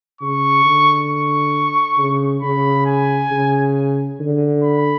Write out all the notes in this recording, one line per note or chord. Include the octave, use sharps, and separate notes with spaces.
C#3 C#6
D3
C#6
C#3
C#3 B5
G#5
C#3
D3
B5